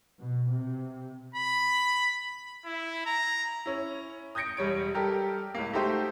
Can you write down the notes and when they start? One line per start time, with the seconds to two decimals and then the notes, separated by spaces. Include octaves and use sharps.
0.20 B2
0.51 C3
1.35 B5
2.65 E4
3.06 A#5
3.66 C#4 E4
4.35 D#6 G6 G#6 A#6 C#7 D7
4.57 E1 G3 C#5 D7
4.95 G3 G4 A4 A#4
5.55 C#2 A2 A#3
5.74 A3 D#4 F#4 G4 C5 E5